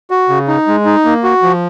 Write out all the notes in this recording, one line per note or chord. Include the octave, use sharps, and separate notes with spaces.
F#4
C#3
D#4
G#3
D#4
A#3
F#4
F3